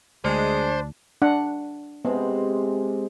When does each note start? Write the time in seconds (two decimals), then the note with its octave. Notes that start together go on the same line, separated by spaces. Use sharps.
0.25 D2 G#3 D4 C5
1.22 D4 F#5
2.05 C3 G#3 B3 C4